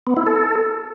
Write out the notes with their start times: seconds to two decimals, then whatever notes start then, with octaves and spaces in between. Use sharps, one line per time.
0.07 B3
0.17 E4
0.26 A4